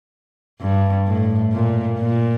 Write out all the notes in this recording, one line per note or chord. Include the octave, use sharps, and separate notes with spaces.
G2
A2
A#2
A#2